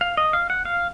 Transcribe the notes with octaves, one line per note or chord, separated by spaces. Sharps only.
F5
D#5
F5
F#5
F5